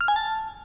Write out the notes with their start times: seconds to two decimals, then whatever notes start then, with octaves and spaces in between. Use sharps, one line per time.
0.01 F6
0.08 G#5
0.16 A5